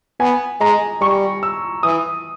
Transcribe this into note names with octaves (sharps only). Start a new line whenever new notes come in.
B3 G#5
G#3 A#5
G3 C#6
E6
E3 D#6